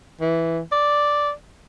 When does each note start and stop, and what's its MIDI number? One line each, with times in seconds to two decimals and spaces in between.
0.21 0.60 52
0.72 1.32 74